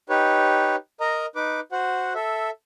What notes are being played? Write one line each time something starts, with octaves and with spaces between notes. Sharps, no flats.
D#4 G4 B4 C#5
A#4 D#5 A#5
D#4 B4 D6
F#4 C5 F#5
A4 E5